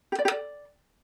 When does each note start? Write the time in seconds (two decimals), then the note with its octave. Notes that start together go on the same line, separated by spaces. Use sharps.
0.12 G4
0.19 D5
0.25 G4
0.31 D5